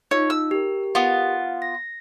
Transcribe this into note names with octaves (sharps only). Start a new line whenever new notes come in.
D#4 F4 C#5
E6
G4 A#4
B3 F4
A#6